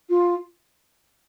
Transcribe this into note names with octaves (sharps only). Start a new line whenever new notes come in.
F4